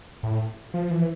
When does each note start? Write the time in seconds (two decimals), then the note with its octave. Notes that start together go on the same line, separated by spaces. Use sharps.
0.23 A2
0.74 F3
0.91 E3